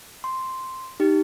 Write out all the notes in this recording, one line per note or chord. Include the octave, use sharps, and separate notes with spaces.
C6
D#4 G4